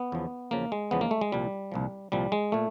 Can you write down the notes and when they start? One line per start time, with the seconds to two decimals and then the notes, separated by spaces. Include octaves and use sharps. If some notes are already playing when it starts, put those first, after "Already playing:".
Already playing: B3
0.12 E2 C#3 F3
0.51 E2 C#3 F3 A#3
0.72 G#3
0.91 E2 C#3 F3 B3
1.01 A#3
1.11 A3
1.21 G#3
1.32 C2 A#2 F3 G3
1.72 C2 A#2 F3
2.12 C2 A#2 F3 G3
2.32 G#3
2.52 A#2 A3